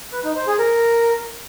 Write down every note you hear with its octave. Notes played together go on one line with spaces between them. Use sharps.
B4
D#4
C5
G#4
A#4